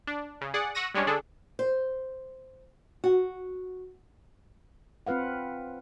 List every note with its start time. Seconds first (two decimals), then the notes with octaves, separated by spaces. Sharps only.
0.07 D4
0.41 C#3
0.54 G#4 D5 F#5
0.75 F#5 C#6 E6 A#6 D#7
0.94 G3 G#3 C#4 D4 C#5
1.07 D3 D4 G#4 A4
1.59 C5
3.04 F#4
5.07 C4 F4 B4 F5 F#5